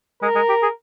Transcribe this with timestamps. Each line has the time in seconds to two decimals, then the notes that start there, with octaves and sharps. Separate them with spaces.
0.22 G#3 A#4
0.35 G#3
0.49 G4
0.62 G#4